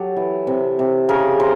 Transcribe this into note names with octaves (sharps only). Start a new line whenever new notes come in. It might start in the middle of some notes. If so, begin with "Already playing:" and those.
Already playing: F#3 G4 A4
E3
C3
C3
C#3 G#4 A#4
A#4 C5